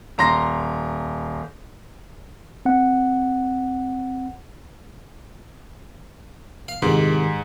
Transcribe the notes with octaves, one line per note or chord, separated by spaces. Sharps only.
D#1 A#5 C6 A#6
C4 F#5
F5
C2 F2 G#2 D#3